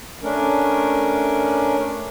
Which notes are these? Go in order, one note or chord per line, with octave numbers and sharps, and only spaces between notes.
A3 C#4 D4 A#4